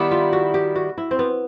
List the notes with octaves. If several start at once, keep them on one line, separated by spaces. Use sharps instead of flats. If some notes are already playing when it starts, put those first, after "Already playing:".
Already playing: D#3 G3 B3 E4
F4
F#4
G4
F#4
E4
C4
B3